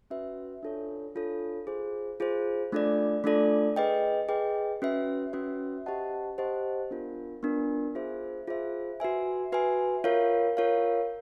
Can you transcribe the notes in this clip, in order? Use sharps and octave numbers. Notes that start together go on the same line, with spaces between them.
C#4 F#4 B4 E5
D4 F4 A4 C#5
D4 F4 A4 C#5
F4 G#4 C5
F4 G#4 C5
A3 D4 F4 A4 D5
A3 D4 F4 A4 D5
G#4 B4 D#5 G5
G#4 B4 D#5 G5
C#4 F#4 B4 E5
C#4 F#4 B4 E5
G4 C5 D#5 F#5 A5
G4 C5 D#5 F#5 A5
B3 D4 F4 A#4
B3 D4 F4 A#4
F4 G#4 C5 E5
F4 G#4 C5 E5
F#4 B4 E5 G#5
F#4 B4 E5 G#5
F4 A#4 C#5 F5
F4 A#4 C#5 F5